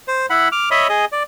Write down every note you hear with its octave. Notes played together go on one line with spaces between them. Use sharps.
C5
E4 F#5 B5
D6 F6
C#5 D#5 E5 B5
G#4 D#5
D5